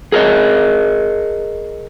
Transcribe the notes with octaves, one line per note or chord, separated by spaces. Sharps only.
G#4 A#4 C#5 D#5